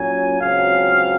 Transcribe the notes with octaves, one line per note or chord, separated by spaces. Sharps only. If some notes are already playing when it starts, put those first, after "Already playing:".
Already playing: A#2 F#3 C#4 G#5
C#2 C#3 F#3 C4 F5